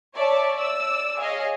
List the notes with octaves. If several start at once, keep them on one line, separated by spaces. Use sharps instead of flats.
C#5 D5 E5 A5
D5 E6
G#4 C#5 D#5 F5